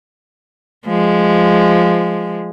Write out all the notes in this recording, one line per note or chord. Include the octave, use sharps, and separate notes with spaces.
F3 G#3